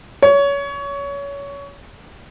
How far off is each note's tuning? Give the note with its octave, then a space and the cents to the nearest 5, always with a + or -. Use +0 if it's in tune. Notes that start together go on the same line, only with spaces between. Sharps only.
C#5 +25